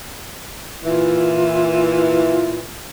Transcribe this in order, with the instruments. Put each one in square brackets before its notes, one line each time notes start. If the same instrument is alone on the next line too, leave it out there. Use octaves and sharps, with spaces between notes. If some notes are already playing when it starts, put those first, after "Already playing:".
[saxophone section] A#2 E3 [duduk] F4